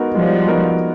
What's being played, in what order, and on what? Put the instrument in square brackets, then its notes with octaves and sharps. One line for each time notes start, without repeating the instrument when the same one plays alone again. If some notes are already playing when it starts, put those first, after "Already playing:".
Already playing: [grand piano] G#3 B3 D#4 F#4 A#4
[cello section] F3 G3 [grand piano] G#3
[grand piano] B3 D#4 F#4 A#4